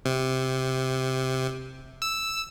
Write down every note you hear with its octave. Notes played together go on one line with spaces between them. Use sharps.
C3
E6